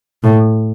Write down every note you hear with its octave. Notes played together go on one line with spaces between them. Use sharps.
A2